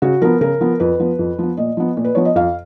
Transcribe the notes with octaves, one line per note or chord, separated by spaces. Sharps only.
C#3 F#4
F3 B3 A#4
C#3 A#4
F3 B3
F2 B4
F3 B3
F2
F3 B3
A#2 D#5
F3 B3
A#2
B4
F3 B3 C#5
D#5
F2 F5